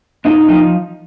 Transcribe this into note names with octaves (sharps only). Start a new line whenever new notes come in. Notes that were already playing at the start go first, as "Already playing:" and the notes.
A#2 D#4
F3 D#4